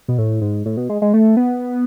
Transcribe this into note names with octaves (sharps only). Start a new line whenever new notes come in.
B2
A2
G#2
A2
B2
G#3
G#3
A3
B3